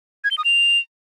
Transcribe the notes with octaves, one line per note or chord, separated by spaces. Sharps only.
G#6
G7
D#6
F7